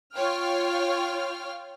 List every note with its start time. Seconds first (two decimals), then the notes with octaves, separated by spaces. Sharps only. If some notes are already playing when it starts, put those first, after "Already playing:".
0.15 F4 C#5 F5 G5 F6